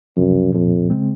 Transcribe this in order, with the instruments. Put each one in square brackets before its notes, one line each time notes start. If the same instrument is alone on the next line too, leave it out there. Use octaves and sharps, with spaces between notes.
[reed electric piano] C#2 C3 F3 [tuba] F#2
[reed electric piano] C2 A#2 F3 [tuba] F2
[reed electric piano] C#3 G#3 C4